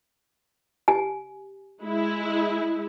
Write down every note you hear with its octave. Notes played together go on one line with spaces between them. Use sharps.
G4 G#5
G#3 E4